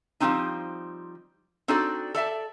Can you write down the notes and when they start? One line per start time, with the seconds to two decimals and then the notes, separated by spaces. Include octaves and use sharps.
0.20 F3 G3 G#3 C4 D#4
1.68 C4 D4 D#4 F#4 A4 D5
2.14 A4 D5 E5 A5